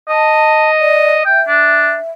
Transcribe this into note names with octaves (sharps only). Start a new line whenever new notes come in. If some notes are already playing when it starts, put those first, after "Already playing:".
D#5 A5
D5
E5 G5
D4